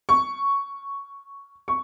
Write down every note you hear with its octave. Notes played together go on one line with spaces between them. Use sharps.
C#6
C#6